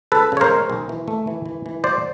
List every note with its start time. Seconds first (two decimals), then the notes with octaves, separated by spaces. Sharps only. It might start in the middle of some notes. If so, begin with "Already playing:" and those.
0.12 C#2 A4 B4
0.32 C#3 C#5
0.41 A#4 C5
0.50 G#3
0.70 B1
0.89 E3
1.08 A3
1.27 E3
1.46 E3
1.66 E3
1.84 F#3 C5 D5